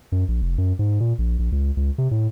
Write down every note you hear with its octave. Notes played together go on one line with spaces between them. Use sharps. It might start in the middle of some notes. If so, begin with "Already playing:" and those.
F#2
A#1
F1
F#2
G#2
A#2
A#1
A#1
C#2
C#2
C3
A2